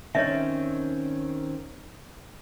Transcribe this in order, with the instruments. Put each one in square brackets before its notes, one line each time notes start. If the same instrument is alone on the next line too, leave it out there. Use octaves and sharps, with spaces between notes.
[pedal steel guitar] D#3 C4 C#4 [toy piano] C#5 D#5 E5